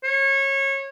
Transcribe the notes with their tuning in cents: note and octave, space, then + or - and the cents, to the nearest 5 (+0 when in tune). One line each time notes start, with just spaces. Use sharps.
C#5 -25